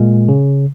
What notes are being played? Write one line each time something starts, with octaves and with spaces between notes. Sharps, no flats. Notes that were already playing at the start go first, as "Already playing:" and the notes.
Already playing: A#2 G#3
C#3